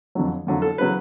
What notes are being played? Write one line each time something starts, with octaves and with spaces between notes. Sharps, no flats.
F2 D3 F#3
F2 D3 F#3
A4
C#3 F#3 B4